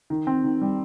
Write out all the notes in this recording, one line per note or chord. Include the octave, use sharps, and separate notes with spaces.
D#3
C4
D#3
G3